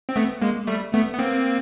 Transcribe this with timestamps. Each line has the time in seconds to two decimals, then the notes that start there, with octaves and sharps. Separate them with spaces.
0.09 C4
0.16 A3 B3
0.42 G#3 A#3
0.67 G3 A3
0.93 A3 B3
1.13 B3
1.19 A#3 C4